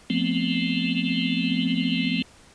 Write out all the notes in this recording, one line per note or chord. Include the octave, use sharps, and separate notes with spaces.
F3 A3 B3 C4